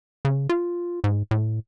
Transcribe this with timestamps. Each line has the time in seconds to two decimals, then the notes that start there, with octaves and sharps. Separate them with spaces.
0.25 C#3
0.49 F4
1.04 G#2
1.31 A2